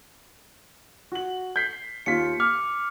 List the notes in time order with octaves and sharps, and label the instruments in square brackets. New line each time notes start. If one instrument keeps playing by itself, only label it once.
[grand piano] F#4 F#7
G6 B6 C7
[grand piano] D#2 F4 B6 [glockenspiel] C#7
[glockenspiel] D6 [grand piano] F6